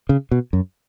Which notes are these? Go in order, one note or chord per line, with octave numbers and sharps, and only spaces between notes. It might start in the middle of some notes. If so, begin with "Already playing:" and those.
C#3
B2
F#2